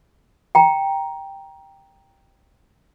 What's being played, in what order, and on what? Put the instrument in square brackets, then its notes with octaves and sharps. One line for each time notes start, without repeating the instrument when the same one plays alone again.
[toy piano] G5 A#5